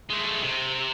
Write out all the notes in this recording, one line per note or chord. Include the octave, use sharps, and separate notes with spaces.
G#3 A3
C3